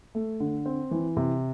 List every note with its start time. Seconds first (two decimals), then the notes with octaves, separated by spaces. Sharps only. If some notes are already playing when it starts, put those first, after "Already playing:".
0.15 A3
0.40 D3
0.66 C4
0.91 E3
1.17 C3